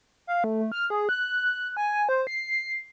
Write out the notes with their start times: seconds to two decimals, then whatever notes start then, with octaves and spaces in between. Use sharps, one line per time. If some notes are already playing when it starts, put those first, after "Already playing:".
0.27 F5
0.44 A3
0.72 F6
0.90 G#4
1.09 F#6
1.77 G#5
2.09 C5
2.27 C7